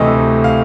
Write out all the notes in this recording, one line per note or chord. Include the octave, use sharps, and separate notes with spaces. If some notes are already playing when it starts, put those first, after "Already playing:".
Already playing: D2 C3 E3 A3 D#5
F5